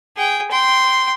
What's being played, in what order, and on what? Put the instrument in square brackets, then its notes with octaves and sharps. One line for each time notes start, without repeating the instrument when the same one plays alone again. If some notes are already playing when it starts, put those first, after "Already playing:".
[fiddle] G#4 G5
G5 C6